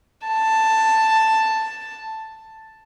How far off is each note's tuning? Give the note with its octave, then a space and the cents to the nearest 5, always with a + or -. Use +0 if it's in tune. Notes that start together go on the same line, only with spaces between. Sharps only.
A5 +5